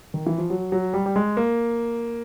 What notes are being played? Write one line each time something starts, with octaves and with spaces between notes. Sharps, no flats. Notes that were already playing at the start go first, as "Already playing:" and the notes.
D#3
E3
F3
F#3
F#3
G3
G3
G#3
A#3